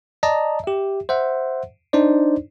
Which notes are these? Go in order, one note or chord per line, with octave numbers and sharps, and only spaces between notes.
D5 D#5 A5 A#5
G4 E5
C5 E5 F#5
D4 D#4 C5 D5